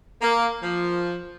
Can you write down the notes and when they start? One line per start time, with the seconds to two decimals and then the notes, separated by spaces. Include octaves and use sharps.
0.22 A#3
0.63 F3